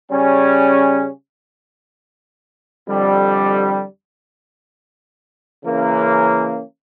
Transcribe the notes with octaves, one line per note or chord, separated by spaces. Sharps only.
C#3 G3 C#4
F2 D3 G3
C#3 E3 A#3 C#4